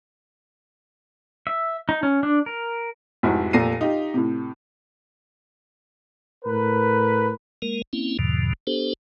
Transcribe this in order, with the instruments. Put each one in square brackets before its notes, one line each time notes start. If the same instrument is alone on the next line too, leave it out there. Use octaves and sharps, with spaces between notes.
[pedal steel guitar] E5
D#4
C#4
D4
A#4
[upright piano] F1 G#2 E4 F#4
F1 A#2 A4 A#6 C7 D#7
D#4 F4 G4
A2 C3
[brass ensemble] A2 A#4 B4
[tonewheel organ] G#3 A#3 A#4
A#3 C4 C#4 E4
E2 G#2 B2 D3 F3
B3 D4 G4 A4 C5